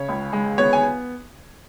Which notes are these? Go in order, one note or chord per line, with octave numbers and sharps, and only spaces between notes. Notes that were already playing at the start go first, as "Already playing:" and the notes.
Already playing: C#3 C#5
C#2
G#3
B3 C#5
G#5